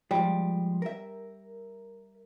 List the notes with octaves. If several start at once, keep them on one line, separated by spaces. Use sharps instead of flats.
F3 G3 G#3
A#4 E5